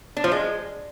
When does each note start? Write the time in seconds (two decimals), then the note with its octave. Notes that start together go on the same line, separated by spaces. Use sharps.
0.17 D4
0.24 F3
0.31 G#3